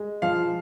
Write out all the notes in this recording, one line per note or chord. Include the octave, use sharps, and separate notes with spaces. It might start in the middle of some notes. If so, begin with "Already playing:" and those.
Already playing: G#3
F3 F5